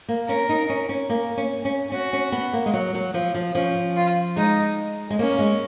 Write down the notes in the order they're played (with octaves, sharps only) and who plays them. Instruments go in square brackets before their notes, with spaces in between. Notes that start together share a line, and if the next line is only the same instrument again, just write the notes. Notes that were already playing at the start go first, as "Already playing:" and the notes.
[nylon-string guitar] A#3
[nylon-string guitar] C#4 [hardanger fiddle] A#4
[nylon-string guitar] D#4
C#4
C#4
A#3
C#4
C#4
[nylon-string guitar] C#4 [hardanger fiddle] F#4
[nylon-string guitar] C#4
B3
A#3
G#3
F#3
F#3
F3
F3
[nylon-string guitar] F3 [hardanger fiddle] C#4
[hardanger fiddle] F4
[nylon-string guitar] G#3 [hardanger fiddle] D#4
[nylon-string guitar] G#3
[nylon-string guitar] A#3 [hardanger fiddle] C#4
[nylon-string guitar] G#3